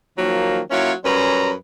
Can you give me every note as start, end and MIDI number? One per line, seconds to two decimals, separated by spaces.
0.18 0.61 51
0.18 0.61 53
0.18 0.61 54
0.18 0.61 58
0.71 0.93 54
0.71 0.93 58
0.71 0.93 61
0.71 0.93 64
0.71 0.93 65
0.71 0.93 73
1.04 1.52 42
1.04 1.52 55
1.04 1.52 61
1.04 1.52 71
1.04 1.52 72
1.04 1.52 82